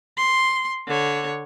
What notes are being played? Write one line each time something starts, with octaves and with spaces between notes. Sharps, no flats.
C6
D3 C#5